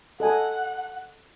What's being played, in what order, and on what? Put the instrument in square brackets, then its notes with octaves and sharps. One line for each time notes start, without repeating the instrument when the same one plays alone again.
[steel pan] A4 D#5 G#5 [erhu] F#5